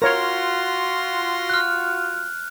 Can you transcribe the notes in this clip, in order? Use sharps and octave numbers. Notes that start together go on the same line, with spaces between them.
F4 F#4 A#4 C#5 C6 A#6
F6 F#6